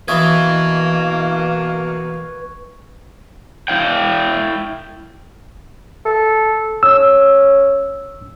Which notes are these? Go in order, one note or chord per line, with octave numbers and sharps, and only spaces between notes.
B2 E3 A#3 B4 D#5 E5 C#6 G#6
E4 F5 G5
A4
C#4 E6